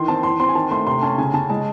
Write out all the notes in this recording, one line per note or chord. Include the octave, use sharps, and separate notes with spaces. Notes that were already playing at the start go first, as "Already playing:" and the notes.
Already playing: D#3 E3 C6
C4 A5
E3 C6
C4 C6
G#5
D#3 A5
A3 C6
C3 C6
C#4 A5
C#3 G#5
C#3 A5
G#3 A5